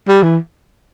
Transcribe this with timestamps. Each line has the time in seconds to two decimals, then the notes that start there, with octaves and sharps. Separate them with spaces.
0.08 G3
0.23 E3